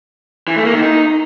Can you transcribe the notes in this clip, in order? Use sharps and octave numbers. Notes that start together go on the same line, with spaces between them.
E3
A3
A#3
D#3
D#4